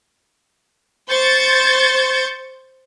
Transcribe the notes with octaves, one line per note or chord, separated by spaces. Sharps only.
C5 C#6 G6 A6